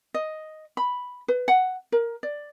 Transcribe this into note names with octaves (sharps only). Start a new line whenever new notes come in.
D#5
B5
B4
F#5
A#4
D5